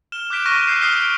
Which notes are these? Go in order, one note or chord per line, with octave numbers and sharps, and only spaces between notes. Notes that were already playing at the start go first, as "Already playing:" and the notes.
F6 E7 G7
D6 F#6 G6 B6 D7 E7
C#6 F6 F#6 A#6 D#7
E6 F#6 G6 B6 C7 E7
D#6 F6 G6 B6 C7 G7
D7